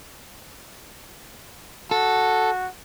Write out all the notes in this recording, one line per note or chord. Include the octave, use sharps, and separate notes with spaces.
F#4 A4